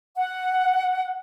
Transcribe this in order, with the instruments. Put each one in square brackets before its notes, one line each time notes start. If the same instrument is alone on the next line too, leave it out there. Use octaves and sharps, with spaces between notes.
[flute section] F#5